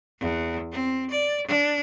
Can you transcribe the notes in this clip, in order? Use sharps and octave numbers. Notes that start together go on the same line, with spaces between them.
E2
C4
D5
D4